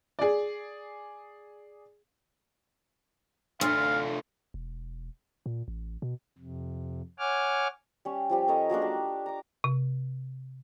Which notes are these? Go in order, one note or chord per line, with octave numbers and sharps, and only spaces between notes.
G#4 D5
D2 A3 F4 F5
E1
A#2
A1
B2
F2 C3
C#5 F#5 G#5 D6 F6
G3 C#4
F3 G3 G4
C#4 A4 A#4 D#5
F#3 G#3 A#3 D4
G4 A5
A#5 D6
C3